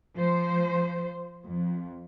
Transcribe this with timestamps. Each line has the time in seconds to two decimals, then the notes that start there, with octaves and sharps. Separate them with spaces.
0.16 F3 C5
1.43 F2